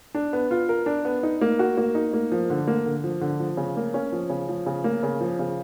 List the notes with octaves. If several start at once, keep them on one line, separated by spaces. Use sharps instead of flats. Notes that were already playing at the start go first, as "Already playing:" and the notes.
D4
B3
F4
A#4
D4
B3
D#4
A#3
F#4
A#3
D#4
A#3
F3
D3
A#3
D3
F3
D3
F3
C#3
A#3
C#4
F3
C#3
F3
C#3
A#3
C#3
F3
C#3